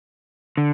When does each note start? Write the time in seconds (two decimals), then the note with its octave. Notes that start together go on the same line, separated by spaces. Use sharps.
0.57 D3